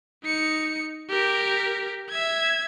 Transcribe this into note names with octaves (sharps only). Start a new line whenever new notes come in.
D#4 C#7
G4 A#4
E5 G#6